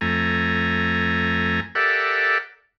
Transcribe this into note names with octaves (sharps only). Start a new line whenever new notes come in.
F2 A3 G#5 A#5
G4 A4 A#4 D5 E5 F#5